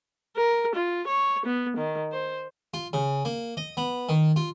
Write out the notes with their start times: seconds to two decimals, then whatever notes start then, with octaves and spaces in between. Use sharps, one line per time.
0.36 A#4
0.75 F4
1.07 C#5
1.46 B3
1.77 D#3
2.12 C5
2.74 F4
2.93 C#3
3.25 A#3
3.57 D#5
3.77 B3
4.09 D#3
4.36 F4